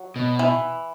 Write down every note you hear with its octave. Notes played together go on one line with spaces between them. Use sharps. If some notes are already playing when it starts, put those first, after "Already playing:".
Already playing: F#3
B2
E3